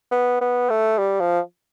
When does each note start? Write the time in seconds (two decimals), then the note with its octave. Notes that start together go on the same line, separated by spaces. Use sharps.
0.12 B3
0.41 B3
0.70 A3
0.99 G3
1.21 F3